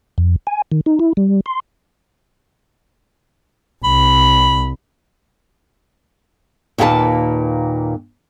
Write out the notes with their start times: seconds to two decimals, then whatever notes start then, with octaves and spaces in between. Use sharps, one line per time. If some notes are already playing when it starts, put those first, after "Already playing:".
0.18 F2
0.47 G#5
0.72 D#3
0.86 D#4
0.99 E4
1.17 G3
1.46 C6
3.84 C2 B5
6.78 D#2 A#2 A#3 G4 B4 A5